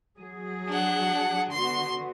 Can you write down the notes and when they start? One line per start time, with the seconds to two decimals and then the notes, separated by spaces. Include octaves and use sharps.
0.18 F#3 G#4
0.69 D4 F#5
1.52 D3 B3 F#4 C6